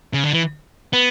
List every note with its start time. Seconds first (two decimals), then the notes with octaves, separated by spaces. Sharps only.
0.13 C#3
0.24 D3
0.33 E3
0.93 B3